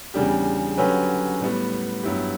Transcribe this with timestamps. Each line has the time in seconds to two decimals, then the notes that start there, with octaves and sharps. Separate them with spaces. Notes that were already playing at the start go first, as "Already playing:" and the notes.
0.14 E2 C#3 G3 D4 G4
0.77 D3 F#3 C#4 G4 B4
1.41 A2 G3 B3
2.03 G2 F#3 B3 E4 G4